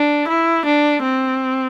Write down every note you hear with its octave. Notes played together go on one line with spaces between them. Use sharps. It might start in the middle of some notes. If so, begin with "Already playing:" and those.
Already playing: D4
E4
D4
C4